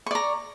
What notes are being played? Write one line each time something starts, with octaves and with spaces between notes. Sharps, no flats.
D5 A#5 C#6